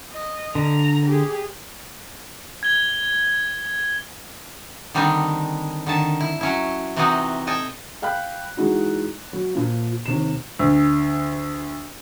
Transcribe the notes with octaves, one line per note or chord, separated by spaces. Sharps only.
D#5
D3 A#5
G4 G#4
G#6 G7
D3 D#3 G3 C4 D4 D#4
D3 D#3 A5
E4
F#3 C#4 E4
C3 E3 C4 D#4 F#4 D#5
A4 D#5 G5 G#5
F5 G5 B5 F#6
E3 G#3 D#4 F#4
F#3
A#2 F3
D#2 C3 E7
D2